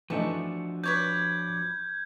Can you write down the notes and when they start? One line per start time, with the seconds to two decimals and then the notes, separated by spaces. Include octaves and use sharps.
0.10 E3 F3 A3 D4 D#4 F#4 C#6
0.84 B4 C#5 D5 G6 G#6